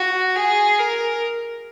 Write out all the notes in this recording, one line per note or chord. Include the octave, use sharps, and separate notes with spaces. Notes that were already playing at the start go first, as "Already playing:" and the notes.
Already playing: F#4
G#4
A#4